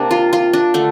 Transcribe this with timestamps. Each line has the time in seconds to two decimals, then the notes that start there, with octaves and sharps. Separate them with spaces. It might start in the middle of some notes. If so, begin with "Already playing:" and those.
Already playing: C3 A#3 D4
0.11 F4
0.33 F4
0.53 D4
0.74 D3 A3